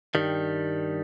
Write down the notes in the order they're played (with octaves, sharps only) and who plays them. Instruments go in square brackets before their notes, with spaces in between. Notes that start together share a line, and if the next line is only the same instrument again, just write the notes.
[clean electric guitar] G2 D#3 G3